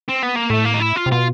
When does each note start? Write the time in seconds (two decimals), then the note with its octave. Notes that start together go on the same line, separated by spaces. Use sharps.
0.09 C4
0.23 B3
0.36 A#3
0.50 A2 A3
0.65 A#3
0.74 D#4
0.80 E4
0.96 F4
1.06 C3
1.11 B2 F4